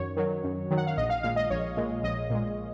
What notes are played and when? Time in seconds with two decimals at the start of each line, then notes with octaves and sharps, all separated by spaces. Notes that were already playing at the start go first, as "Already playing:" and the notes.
Already playing: F#2 D#3 F#3 C#5
0.17 D#3 F#3
0.44 F#2
0.71 D#3 F#3
0.77 F#5
0.87 F5
0.97 A#1 D#5
1.10 F5
1.23 A#2 G#3 F5
1.36 D#5
1.50 A#1 C#5
1.77 A#2 G#3
2.03 A#1 D#5
2.30 A#2 G#3